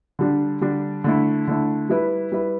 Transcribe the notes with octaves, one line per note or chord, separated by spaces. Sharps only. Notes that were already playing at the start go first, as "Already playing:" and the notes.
D3 G3 D4
D3 G3 D4
D3 A3 E4
D3 A3 E4
G3 E4 B4
G3 E4 B4